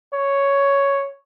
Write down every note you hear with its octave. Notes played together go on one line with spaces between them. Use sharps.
C#5